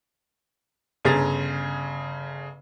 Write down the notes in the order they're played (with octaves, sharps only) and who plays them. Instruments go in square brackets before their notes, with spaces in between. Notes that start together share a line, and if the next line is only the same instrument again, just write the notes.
[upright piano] G1 C#3 G#4 A#5 A6